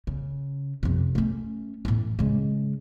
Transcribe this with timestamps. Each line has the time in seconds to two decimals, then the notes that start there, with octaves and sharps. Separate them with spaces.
0.07 C#3
0.83 F2 C3
1.15 A3 C#4
1.85 A2 E3
2.19 C#3 G#3